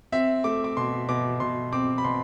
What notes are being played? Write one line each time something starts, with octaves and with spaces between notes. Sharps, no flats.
C4 E5
A3 D6
D6
B2 C6
B2 D6
B2 C6
C4 D6
B5
B2 C6